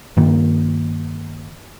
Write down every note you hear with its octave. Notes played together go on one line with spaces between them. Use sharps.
G2 D#3 A#3